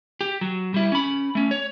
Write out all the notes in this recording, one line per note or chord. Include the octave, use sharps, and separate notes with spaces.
G4
F#3
G3 E4
C#4 B5
A3 C#4
C#5